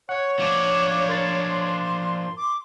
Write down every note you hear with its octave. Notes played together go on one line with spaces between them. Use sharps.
C#5 F#5 C#6
F3 D4 D6
A#4 C6 A6
D6